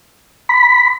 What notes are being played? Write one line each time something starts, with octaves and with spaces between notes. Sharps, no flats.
B5